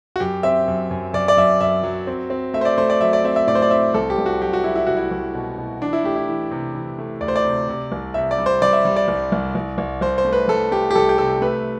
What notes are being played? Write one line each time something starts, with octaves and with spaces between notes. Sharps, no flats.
F#4
F#2 G4
C4 E5
F#2
F#2
F#2 D5
D5
F#2 E5
F#2 E5
F#3
C4
C4
A3 E5
C5
D5
A3 C5
D5
F#3 E5
D5
C4 E5
E5
A2 D5
C5
D5
C4 E5
C2 A4
G4
C2
F#4
F#3 G4
F#4
F#3 E4
E4
C2 F#4
E4
C2
B2
B2
E3 D4
E4
A3 G4
E4
E3
C3
E3
A3
D2 D5
C5
D5
C3
C3
C2
C3 E5
D5
G3
C5
G3 D5
E5
G3
D5
C2
C2
C2
C2
C2 C5
C5
A3
B4
C2 A4
A3 G4
G4
C2 A4
G4
C3 A4
A3 B4